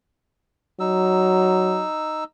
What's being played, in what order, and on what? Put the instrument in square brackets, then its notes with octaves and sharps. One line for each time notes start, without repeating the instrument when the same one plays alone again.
[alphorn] F#3 [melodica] D#4 E6